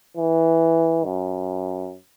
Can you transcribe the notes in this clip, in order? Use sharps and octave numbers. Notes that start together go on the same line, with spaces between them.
E3
F#2